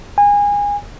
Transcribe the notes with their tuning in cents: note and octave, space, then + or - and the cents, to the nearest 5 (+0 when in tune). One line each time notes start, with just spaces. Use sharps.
G#5 -25